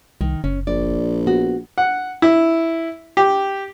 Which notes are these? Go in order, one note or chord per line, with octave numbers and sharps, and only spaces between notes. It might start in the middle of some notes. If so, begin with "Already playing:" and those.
C2 D#3
F#1 C#4
A#1 D5
B3 F#4
F#5
E4
G4